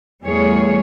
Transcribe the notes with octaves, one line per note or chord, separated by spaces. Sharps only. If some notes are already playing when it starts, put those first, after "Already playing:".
E2 G3 A3 G#4 C#5